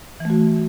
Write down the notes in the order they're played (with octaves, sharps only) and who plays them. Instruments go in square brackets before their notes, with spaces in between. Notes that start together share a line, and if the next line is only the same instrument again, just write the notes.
[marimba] E3
A3
F#4